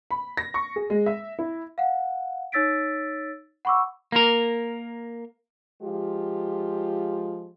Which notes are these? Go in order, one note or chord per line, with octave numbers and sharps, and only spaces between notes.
B5
A#6
C#6
G#4
G#3
E5
E4
F5 F#5
D#4 C#5 E6 A6 B6 D7
F#5 B5 C#6 D6 E6
A#3 A#4
F3 G#3 F4 G4